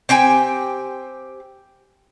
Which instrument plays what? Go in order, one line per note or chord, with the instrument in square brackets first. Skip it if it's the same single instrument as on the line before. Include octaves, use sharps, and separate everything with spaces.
[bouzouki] C4 G4 G5 G#5